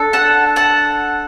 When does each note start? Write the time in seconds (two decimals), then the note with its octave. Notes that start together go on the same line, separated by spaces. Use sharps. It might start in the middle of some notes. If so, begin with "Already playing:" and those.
Already playing: D4 A4
0.13 F#5 A5
0.56 F#5 A5